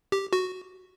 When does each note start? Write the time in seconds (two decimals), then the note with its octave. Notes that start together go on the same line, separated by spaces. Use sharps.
0.12 G4
0.33 F#4